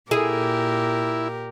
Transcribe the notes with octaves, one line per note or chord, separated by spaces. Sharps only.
A#2 E4 G4 G#4 A#4